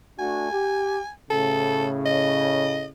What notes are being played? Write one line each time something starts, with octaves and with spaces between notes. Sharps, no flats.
A3 D4 F#4 G#5
G4
A2 C#3 A4
D#5